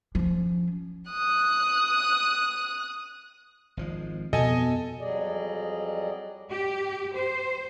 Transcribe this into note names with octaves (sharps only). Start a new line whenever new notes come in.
F3 C#4
D#6 F#6
G#1 F3 G#3
F2 B2 A4 D#5 G#5
F2 F#3 G3 G#4 D5 D#5
G4
C5